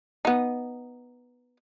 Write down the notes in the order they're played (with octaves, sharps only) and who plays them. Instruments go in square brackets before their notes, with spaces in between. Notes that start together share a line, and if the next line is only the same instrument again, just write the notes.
[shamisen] B3 D#4